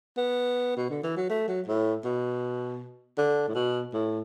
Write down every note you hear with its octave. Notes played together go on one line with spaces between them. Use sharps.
B3
B2
D3
E3
F#3
A3
F#3
A2
B2
D3
A2
B2
A2